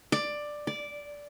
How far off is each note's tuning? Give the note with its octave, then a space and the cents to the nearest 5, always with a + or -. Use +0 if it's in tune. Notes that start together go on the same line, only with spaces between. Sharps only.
D5 +10
D5 -10